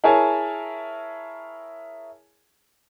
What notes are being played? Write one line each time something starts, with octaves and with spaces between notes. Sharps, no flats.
E4 G#4 A#4 C#5 G#5 A5